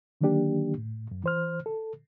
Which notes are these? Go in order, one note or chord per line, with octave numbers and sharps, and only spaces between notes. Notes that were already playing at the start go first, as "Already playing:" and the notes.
D3 D#3 F#3 A#3 D4 G4
A2
F#2
E3 C5 F6
A4